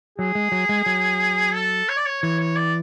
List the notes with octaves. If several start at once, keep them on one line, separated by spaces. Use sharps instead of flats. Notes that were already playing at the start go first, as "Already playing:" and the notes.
F#3 G#4
G#3
F#3
G#3
F#3
A4
C#5
D5
C#5
E3 C#5
C#5
D5